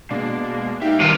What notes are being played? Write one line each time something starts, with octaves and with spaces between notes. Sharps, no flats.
B2 G#3 A#3 D4
D#4 G4 B4 E5 F5 G5
C3 D#3 G3 D#4 F4